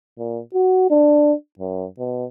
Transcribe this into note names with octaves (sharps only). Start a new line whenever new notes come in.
A#2
F#4
D4
F#2
B2